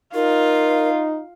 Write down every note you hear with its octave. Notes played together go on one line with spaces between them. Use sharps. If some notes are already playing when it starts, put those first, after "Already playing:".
D#4 F4 A#4